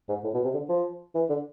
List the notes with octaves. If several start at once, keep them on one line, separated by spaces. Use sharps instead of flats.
G#2
A2
B2
C3
D3
F3
E3
D3